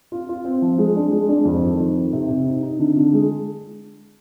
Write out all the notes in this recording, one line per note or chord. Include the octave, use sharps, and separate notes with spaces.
F4
F4
C4
F3
G#3
D4
G#3
D4
F2
D#3
F2
D#3
C3
C3
D#4
D#4
D3
D3
G#3